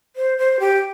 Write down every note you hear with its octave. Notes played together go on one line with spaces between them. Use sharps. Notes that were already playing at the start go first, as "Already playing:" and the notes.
C5
C5
G4